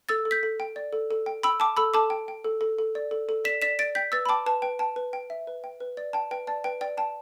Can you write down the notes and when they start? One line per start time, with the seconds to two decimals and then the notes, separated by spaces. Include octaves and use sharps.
0.09 A4 E6 A6
0.25 A4
0.31 G6 B6
0.43 A4
0.60 G5
0.76 D5
0.93 A4
1.11 A4
1.26 G5
1.43 G5 B5 E6
1.60 G5 A5 D6
1.77 A4 B5 E6
1.94 A4 A5 D6
2.10 G5
2.28 G5
2.44 A4
2.61 A4
2.79 A4
2.95 D5
3.11 A4
3.29 A4
3.45 D5 B6 E7
3.62 D5 B6 E7
3.79 D5 A6 D7
3.95 G5 G6 B6
4.12 B4 E6 A6
4.26 B5
4.29 G5 A5 D6
4.46 B4 A5
4.62 B4 G5
4.79 G5 A5
4.96 B4
5.13 G5
5.30 E5
5.47 B4
5.64 G5
5.80 B4
5.97 D5
6.13 G5 A5
6.31 B4 G5
6.47 D5 A5
6.64 B4 G5
6.81 D5 G5
6.97 G5 A5